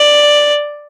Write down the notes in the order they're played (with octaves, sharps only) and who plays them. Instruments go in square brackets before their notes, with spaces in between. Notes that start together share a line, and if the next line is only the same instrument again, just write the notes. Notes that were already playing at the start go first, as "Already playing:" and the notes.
Already playing: [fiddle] D5